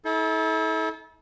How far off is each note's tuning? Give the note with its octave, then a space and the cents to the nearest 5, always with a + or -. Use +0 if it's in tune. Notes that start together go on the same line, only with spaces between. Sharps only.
E4 -45 A4 -30